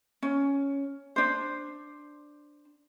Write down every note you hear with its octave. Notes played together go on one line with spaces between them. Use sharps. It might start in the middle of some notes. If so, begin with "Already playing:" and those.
C#4
D4 C5